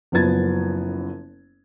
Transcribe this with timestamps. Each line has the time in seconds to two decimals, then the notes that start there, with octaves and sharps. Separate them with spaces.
0.12 F#1 F#2 F3 B3 G#6 A6